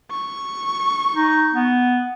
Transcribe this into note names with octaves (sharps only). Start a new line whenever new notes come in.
C#6
D#4
B3